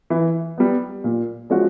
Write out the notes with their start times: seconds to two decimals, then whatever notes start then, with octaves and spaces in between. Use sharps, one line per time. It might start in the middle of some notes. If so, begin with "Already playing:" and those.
0.10 E3
0.58 G3 B3
1.04 A#2
1.50 F3 G#3 C#4 F#4